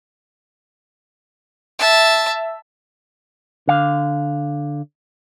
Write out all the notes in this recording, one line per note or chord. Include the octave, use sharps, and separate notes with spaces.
E5 A5
D3 F5